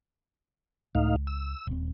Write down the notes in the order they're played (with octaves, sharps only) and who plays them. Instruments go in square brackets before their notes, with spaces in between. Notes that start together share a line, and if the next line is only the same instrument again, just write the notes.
[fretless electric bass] C#2 [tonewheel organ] A2 D#4 F5
[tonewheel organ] E6
[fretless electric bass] D#1 C4